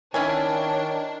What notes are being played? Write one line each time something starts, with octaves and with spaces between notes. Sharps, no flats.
D#3 C#4 D4 E4 C#5 G#5